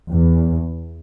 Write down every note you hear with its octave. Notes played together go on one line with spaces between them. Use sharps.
E2